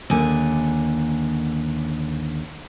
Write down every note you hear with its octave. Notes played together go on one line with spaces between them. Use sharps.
D#2 D3 G#5